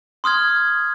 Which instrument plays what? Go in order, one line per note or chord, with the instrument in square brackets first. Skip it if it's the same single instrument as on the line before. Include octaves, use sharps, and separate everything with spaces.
[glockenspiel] C6 D#6 F6 G#6